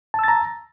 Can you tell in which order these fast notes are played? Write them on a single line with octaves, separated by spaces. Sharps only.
A5 E6 A6 A#5